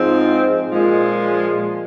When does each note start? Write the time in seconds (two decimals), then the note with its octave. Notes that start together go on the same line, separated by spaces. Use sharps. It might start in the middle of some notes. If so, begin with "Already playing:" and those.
Already playing: G#2 F3 G#3 C4
0.69 A#2 F3 G#3